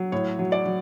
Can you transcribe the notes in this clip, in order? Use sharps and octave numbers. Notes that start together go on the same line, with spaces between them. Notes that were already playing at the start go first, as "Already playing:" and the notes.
Already playing: F#3
A2 C#5
F#3
D5
F#3